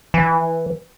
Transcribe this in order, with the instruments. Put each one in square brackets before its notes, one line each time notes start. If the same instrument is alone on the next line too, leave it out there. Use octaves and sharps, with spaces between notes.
[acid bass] E3